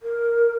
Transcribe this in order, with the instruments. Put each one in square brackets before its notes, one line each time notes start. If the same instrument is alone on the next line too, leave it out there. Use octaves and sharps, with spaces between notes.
[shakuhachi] A#4